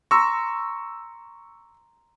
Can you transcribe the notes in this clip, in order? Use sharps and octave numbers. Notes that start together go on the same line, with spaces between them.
A#5 C6 C#6 E6 A#6